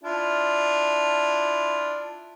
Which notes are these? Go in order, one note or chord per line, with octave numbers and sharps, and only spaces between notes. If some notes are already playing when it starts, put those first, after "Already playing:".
D4 E4 F4